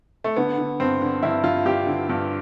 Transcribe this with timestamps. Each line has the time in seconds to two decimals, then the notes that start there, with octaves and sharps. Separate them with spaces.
0.24 A3
0.37 D3 B3
0.58 D3
0.80 G2 C4
1.02 D3
1.23 G2 E4
1.44 G2 F4
1.65 G2 G4
1.87 D3
2.09 G2